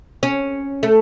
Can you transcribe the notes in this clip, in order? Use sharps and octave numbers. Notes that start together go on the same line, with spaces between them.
C#4
A3